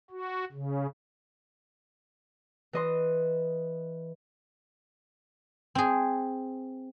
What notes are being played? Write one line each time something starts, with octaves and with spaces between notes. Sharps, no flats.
F#4
C#3
E3 D#5 C6
C4 G#4